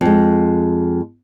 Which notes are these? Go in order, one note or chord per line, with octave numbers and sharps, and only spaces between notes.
F2 G#3